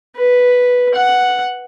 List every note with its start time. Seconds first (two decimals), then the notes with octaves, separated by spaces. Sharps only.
0.16 B4
0.94 F#5